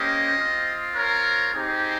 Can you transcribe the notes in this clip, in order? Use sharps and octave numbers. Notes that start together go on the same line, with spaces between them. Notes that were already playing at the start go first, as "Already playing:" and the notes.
Already playing: A#3 C#4 G4 C5 D#5
C4 F4
A#4 C#5
C4 D#4 G4 G#4 C5